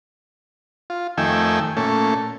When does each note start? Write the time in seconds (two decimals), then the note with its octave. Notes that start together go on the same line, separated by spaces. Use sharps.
0.90 F4
1.18 F2 D#3 A3 G5 G#5 E6
1.77 A#2 A3 C#4 A4